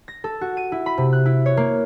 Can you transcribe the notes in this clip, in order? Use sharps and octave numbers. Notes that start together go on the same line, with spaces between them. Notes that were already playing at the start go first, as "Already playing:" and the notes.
A#6
A4
F#4
D#7
E4
B5
C3
F#6
E4
C#5
A#3